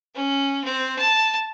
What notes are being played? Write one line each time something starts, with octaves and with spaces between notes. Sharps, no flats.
C#4
C4
A5